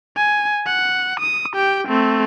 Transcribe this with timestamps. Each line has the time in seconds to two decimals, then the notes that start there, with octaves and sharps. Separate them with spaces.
0.16 G#5
0.66 F#5
1.20 D#6
1.54 G4 G5
1.88 A3 C4